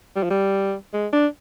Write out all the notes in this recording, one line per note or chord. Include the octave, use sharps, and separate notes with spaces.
G3
F3
G3
G#3
D4